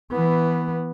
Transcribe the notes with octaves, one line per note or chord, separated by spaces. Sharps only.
E3 B3